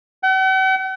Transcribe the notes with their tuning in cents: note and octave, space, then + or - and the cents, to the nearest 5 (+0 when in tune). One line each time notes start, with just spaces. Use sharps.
F#5 +45